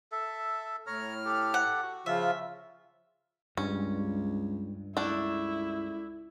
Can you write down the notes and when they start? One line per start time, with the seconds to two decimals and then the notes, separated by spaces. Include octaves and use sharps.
0.12 A4 E5
0.87 A2 C#5 A#5 F6
1.25 G4 A4
1.54 F#5
1.82 F#4
2.06 C#3 F3 F4 E5
3.57 C#2 G2 C#4
4.97 C#2 A3 D4 E4